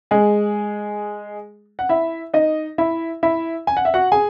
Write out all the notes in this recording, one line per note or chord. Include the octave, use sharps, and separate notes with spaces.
G#3 G#4
F#5
E4 E5
D#4 D#5
E4 E5
E4 E5
G#5
F#5
E5
F#4 F#5
G#4 G#5